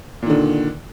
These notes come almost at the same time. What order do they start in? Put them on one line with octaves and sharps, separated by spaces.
A#2 D#3 D3